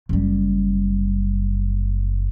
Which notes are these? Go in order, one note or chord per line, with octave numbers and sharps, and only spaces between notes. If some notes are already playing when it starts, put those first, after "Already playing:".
F#1 G3